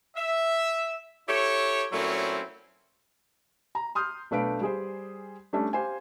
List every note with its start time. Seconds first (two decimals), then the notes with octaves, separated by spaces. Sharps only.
0.16 E5
1.28 E4 G4 A4 C#5
1.92 A#2 F#3 A3 C4 C#4 E4
3.75 A#5
3.95 C6 D#6 F6 G6
4.31 B1 A3 D4 B4 F5 D7
4.61 G3 G#4 C5
5.53 G3 A3 C#4 D4
5.73 G4 C5 F5 G#5